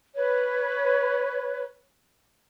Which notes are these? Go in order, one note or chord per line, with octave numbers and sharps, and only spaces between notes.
B4 C#5